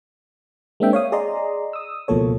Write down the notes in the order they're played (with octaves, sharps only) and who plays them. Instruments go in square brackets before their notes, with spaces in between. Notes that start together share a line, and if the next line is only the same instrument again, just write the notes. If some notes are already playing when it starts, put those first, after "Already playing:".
[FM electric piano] G#3 A#3 C4 D4 E5 G5
C#5 F5 D#6
G#4 D5 D#5 A#5 C6
D#6 E6
C#2 B2 F3 A#3 A4 C#5